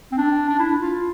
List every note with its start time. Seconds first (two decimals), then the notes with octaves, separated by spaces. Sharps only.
0.12 C4
0.18 D4
0.50 D4
0.59 E4
0.80 F4